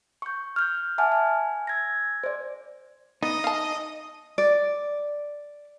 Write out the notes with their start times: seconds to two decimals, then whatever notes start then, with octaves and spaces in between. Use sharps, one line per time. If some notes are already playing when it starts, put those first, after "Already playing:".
0.22 C#6 G6
0.56 F6 G6
0.98 E5 F#5 G#5 A5 D6 F6
1.12 G#5
1.67 E6 G#6 A#6
2.24 C5 D5
3.23 B3 D#4 D#5 D#6
3.44 F5 A5
4.38 D5